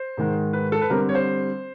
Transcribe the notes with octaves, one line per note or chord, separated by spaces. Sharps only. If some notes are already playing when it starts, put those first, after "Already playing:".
Already playing: C5
G#2 D#3 G#3
B4
A4
B4
D3 G3 C4 A#4
C#5
C5